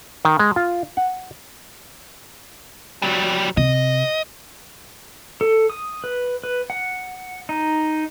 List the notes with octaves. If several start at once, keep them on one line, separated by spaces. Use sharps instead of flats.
D#3
G#3
F4
F#5
F#3 G3
C3 D#5
A4
D#6
B4
B4
F#5
D#4